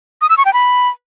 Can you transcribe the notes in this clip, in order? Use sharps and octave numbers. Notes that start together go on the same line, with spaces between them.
D#6
E6
C#6
G5
B5